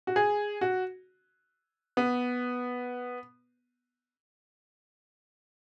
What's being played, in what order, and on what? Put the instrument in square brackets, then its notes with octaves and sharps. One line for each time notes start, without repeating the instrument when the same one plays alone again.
[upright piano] F#4
G#4
F#4
B3